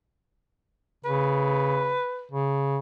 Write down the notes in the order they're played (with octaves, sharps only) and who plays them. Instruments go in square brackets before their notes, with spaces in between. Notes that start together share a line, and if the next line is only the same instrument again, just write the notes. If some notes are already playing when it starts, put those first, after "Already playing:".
[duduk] C#3 [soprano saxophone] B4
[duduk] C#3